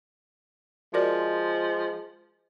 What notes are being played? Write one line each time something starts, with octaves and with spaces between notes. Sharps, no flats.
F3 G#3 F#4 A#4 D5